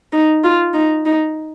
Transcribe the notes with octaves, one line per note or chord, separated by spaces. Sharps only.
D#4
F4
D#4
D#4